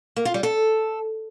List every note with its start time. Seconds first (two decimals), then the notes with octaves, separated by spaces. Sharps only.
0.17 A#3
0.25 F4
0.34 G3
0.43 A4